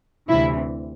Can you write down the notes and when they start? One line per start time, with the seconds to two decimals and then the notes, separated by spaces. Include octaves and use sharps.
0.29 D2 C3 E3 E4